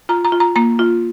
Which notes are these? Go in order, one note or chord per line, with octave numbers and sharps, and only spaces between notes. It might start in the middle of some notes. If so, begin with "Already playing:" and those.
F4 A#5
A#5
F4
A#5
A#3 A#5
F4